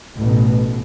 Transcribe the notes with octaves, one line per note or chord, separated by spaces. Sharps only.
A1 B2